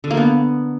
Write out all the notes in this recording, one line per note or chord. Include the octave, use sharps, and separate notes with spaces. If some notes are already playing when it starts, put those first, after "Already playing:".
D3
A#3
B3